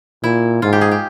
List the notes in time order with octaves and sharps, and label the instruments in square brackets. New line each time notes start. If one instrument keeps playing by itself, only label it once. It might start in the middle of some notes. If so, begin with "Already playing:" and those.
[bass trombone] A#2 [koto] E4
[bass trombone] G#2 [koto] F4
[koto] G4
G#4
G4